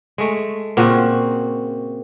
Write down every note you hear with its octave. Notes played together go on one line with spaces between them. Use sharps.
G#3 A3
A#2 C#3 C4 F#4